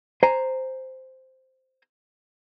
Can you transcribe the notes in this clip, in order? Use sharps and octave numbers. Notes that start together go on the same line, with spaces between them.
C5 G#5 A#5